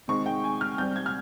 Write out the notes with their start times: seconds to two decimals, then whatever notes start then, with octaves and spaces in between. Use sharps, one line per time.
0.08 C3 D#3 G#3 C4 C#6
0.26 G5
0.44 G#5
0.61 F6
0.78 C3 G3 C4 G6
0.96 G#6
1.06 F6